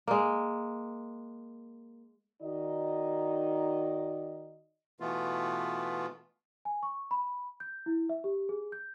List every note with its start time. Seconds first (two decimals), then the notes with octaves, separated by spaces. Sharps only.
0.08 G#3 A#3
2.42 D#3 D#4 F#4 D5 D#5
5.00 B2 E3 A3 B3 F4
6.65 G#5
6.83 C#6
7.11 B5
7.60 G6
7.86 E4
8.09 E5
8.24 G4
8.49 G#4
8.72 G6